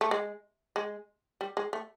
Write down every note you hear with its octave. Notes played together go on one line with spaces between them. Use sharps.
A3
G#3
G#3
G3
G#3
A3